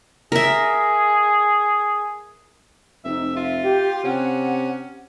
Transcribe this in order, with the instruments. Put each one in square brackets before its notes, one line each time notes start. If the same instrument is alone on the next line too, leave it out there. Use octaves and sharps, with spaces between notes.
[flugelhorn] G#4 [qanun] A#4 E5
[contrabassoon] F1 [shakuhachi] D#4 [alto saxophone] E5
[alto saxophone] F4 [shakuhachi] E5
[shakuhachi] G4
[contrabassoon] C3 [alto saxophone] C#4 [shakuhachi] F#5